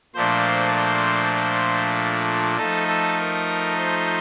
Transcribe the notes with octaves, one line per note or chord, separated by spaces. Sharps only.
A#2 F3 A3 D4 C5
C5
C5
F3 A3 D#4 A4
A4
A#4
C5